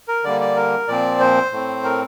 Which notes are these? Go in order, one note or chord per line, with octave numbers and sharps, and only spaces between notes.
A#4
D3 G3 A#3 D5
D5
A#4
A#2 F3 C4 D5
C5
A2 A3 C4
A#4